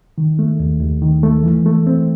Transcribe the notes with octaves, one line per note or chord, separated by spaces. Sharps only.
D#3
A3
D#2
D#2
D#3
A3
E3
A3
C4